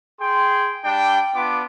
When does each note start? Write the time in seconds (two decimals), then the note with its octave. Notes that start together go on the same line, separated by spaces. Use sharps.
0.20 G#4 G5 C6
0.84 G3 D4 G5
1.35 B3 D4 F4 D6